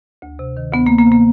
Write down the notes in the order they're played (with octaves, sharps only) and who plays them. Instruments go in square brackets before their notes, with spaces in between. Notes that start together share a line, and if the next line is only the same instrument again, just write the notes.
[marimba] D2
C3
D#3
D2 B3
A#3
D2
A#3
C3
A#3